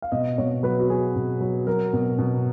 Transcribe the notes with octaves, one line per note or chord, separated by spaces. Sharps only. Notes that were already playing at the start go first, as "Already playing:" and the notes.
F5
B2 D#5
B2 C#5
F#3 B4
F#4
F#3 G#4
B2
F#3
F#3 A#4
B2
B2